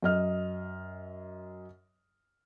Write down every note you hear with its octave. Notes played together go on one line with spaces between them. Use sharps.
F#2 D#5 F6